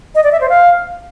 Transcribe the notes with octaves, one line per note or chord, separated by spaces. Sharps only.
D#5
D5
E5
C5
F5